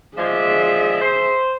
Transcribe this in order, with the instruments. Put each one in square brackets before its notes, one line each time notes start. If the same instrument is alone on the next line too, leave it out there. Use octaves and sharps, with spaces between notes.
[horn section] F3 G#3 D5 [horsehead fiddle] G#4 E5
[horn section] C5